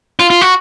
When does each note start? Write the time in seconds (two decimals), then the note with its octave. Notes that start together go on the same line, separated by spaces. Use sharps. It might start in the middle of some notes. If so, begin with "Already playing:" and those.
0.19 F4
0.30 F4
0.41 F#4